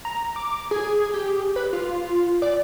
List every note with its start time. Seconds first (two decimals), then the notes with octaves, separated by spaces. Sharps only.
0.05 A#5
0.36 D6
0.71 G#4
1.14 G4
1.56 B4
1.73 F4
2.42 D5